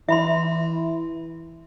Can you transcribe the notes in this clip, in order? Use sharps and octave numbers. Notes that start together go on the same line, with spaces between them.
E3 E5 B5 C6